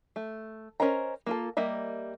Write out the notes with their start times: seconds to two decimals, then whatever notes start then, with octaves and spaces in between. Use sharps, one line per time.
0.16 A3
0.80 C#4 A#4 C5 D#5 A#5
1.26 A#3 F4 A4
1.57 G3 A#3 D#5 E5